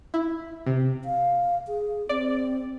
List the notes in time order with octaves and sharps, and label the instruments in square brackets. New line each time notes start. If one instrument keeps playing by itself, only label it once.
[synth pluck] E4
C3
[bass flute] F5
G#4
[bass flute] C4 [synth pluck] D5